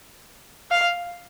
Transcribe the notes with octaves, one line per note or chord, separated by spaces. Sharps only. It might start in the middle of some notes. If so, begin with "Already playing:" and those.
F5